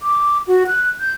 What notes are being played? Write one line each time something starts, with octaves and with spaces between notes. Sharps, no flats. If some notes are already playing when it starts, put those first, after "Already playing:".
D6
F#4
F#6
G6